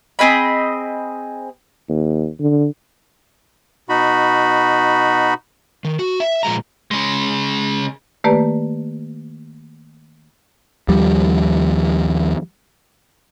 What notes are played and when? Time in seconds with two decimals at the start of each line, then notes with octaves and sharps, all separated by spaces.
0.19 C4 G#4 D#5 B5
1.89 D#2
2.40 D3
3.89 B2 D#4 F#4 B5
5.85 D#3
5.99 F#4
6.20 E5
6.43 A#2 F3 G#3 A#5
6.91 C#3 G#3
8.24 D#3 A3 A#3 G4 B4 D5
10.88 D#2 F3 G3